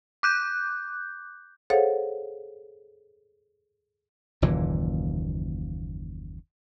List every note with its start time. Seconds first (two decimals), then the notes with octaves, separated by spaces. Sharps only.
0.23 D6 F#6 G6
1.70 G#4 A4 C5 C#5 F5 F#5
4.42 F#1 D#2 A#2 E3